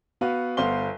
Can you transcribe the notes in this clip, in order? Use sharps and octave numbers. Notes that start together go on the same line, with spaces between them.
B3 F#4 B4 F5
G1 B3 C5 F5 C6 G7